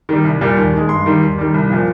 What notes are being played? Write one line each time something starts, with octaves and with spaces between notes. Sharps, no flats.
D#3 G3
C2
A#2 G3
D#2
D#3 G#3
G2 C6
D#3 G3
D#2
D#3 G3
C2
A#2 F3